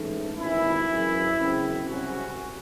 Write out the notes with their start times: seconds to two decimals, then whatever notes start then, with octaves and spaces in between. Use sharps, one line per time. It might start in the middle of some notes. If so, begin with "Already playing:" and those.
Already playing: A1 G#2 E3 A3
0.38 G#1 F#2 E3 E4
0.88 F#1 F#2 C#3 E3
1.38 F#2 C#3 G#3 C4
1.87 C2 C3 F#3 C#4 F#4